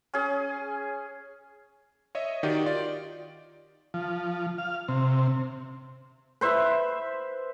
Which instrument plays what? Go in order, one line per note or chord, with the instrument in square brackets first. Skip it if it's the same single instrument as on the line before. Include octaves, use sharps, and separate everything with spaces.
[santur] C#4 G#4
[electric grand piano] C#5 D#5 E5
D#3 D#4 F#4 G4 D5
F4 D5
[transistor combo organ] F3
F5
C3
[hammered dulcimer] B4 C5 E5